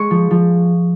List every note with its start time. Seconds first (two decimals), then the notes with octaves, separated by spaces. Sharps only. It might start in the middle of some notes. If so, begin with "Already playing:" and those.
Already playing: G#3 C#6
0.11 F3
0.31 F3